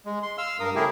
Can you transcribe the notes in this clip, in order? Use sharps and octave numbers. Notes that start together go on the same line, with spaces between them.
G#3
C6
F5 E6 F6
G2 A#4 F5 D#6
C#3 A3 E4 G4 G#4 A#4